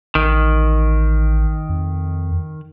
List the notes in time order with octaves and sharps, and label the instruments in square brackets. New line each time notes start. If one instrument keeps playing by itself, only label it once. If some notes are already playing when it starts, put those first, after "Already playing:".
[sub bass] A1 [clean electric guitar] D#3
[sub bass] F2